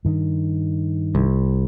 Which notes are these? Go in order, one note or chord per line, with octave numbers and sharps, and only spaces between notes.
G2 D#3
C2